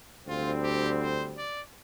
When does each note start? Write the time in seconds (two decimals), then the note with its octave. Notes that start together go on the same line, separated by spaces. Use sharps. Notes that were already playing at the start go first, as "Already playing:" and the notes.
0.26 D2 D3 G3 C4 F4
0.64 G4
0.99 C5
1.36 D5